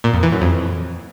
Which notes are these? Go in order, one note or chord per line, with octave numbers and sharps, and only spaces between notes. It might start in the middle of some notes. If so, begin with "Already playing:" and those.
A#2
F2
E3
F#2
F2